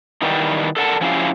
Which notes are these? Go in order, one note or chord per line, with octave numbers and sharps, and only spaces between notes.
D#3 E3 G3 B3 D#4
A4 A#4 D5 F#5 G#5 A5
F3 F#3 C#4 E4 G4 F5